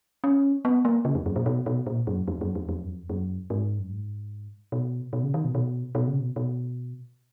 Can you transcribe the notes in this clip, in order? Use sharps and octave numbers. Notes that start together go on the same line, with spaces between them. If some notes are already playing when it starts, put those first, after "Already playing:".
C#4
B3
A#3
C#3
F2
F#2
A#2
B2
B2
A#2
F#2
F2
F#2
F2
F2
F#2
F2
F#2
G#2
F#2
G#2
B2
B2
C#3
D#3
B2
B2
B2
C#3
B2
B2